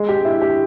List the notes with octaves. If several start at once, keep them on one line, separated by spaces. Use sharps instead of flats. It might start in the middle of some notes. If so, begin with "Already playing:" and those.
Already playing: G#3
G4
E4
G4